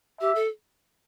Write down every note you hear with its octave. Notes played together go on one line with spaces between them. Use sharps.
G4 E5
A4